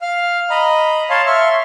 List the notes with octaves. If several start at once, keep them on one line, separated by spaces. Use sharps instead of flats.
F5 F6
D#5 A#5 B5
C#5 F5 A5 C6
E5 C6 C#6 F6